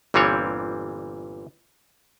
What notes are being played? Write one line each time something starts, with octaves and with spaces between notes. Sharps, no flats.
G1 A#2 E3 G3 C4 C#5